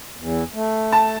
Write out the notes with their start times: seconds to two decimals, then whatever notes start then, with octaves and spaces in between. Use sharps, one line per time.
0.17 E2
0.54 A3
0.92 A5